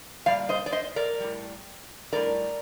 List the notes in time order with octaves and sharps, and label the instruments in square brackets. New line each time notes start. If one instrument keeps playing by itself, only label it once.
[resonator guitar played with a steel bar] A#2 G3 D5 F5
C5 D#5
D5
C5 D#5
A#4 D5
A2 G3
A2 G3 A#4 D5